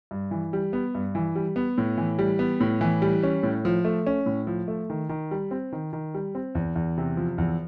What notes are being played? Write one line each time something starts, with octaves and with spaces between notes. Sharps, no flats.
G2
E3
G3
B3
G2
E3
G3
B3
A2
E3
G3
B3
A2
E3
G3
C#4
A2
F3
A3
C#4
A2
F3
A3
D#3
D#3
G3
C4
D#3
D#3
G3
C4
E2
E2
C3
F3
E2